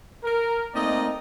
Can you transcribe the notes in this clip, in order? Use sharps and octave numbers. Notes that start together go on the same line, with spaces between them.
A#4
A3 A#3 C4 D#4 D5 D#5